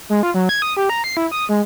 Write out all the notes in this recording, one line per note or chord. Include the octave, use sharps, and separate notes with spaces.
G#3
F4
F#3
G#6
D#6
G4
A#5
C7
E4
D#6
G#3